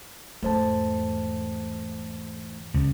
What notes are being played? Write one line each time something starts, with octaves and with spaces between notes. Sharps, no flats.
E2 G#2 A3 C5 A5
C#2